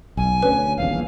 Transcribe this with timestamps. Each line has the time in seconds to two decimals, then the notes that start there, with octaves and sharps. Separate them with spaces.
0.17 B1 G#5
0.42 D2 C#4 B4
0.78 D#1 A#1 E2 F5